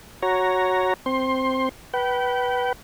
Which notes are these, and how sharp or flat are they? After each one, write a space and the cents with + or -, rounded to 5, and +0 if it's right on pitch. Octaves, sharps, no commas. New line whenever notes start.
F#4 +0 C#5 +0 A#5 +0
C4 +0 C6 +20
B4 -10 G5 -35